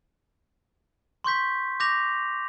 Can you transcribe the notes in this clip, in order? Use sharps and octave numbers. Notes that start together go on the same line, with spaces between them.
C6 C#6 G6 B6
D6 G6 A#6 F7